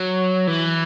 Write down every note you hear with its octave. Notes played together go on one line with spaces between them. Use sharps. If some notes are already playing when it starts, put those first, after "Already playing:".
Already playing: F#3
E3